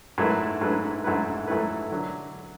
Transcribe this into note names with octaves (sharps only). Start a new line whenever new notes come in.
G#2 F#3 A3 E4 B4
G#2 F#3 A3 E4 B4
G#2 F#3 A3 E4 B4
G#2 F#3 A3 E4 B4
D3 F#3